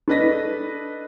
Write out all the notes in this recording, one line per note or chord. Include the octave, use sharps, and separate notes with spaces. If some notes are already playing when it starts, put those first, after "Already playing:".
D4 A4 B4 D#5 A#6 B6